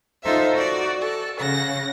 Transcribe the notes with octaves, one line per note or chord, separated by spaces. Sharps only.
D#4 F4 A4 C5 E5
F#4 D5
A4
C#3 F#5 A#6